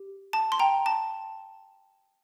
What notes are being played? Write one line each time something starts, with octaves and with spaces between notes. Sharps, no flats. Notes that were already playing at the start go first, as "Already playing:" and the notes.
Already playing: G4
A5
C6
G5 A#5
A5